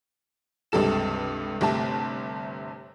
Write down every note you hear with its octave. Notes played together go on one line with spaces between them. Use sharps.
C#2 G2 C3 A4 E7
G1 C3 A3 A5